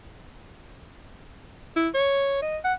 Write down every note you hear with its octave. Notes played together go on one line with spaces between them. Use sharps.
E4
C#5
D#5
F#5